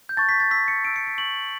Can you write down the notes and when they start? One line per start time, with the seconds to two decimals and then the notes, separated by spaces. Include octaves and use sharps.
0.09 G6
0.17 A5 C#6 F#6 A6
0.29 B6
0.40 A6
0.51 C#6 E6 G6 B6
0.68 C#7
0.84 C#6 E6 G6 D7
0.96 C#7
1.07 B6
1.18 C#6 E6 G6 F#7